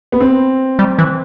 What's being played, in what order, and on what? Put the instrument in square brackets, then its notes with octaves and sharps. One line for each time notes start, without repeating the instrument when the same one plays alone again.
[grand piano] B3
C4
[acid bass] G3
E3